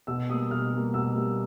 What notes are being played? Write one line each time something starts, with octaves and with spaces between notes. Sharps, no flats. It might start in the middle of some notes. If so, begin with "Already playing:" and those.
B2 E6
G3 A#3 D#6
B2 F6
G3 A#3
B2 E6
G3 A#3